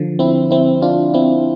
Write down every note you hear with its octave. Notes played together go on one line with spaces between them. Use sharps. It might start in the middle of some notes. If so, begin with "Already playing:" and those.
Already playing: D3 F3
C4 E4
C4 E4
D4 F4
C4 E4